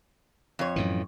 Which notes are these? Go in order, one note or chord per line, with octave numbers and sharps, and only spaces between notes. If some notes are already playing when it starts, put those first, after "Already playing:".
F2 C#5
F#2 A2 E3